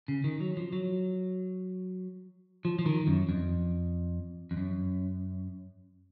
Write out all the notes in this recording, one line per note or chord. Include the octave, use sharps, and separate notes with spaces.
C#3
D#3
F#3
F3
F#3
F3
F3
D#3
F#2
F2
F2
F#2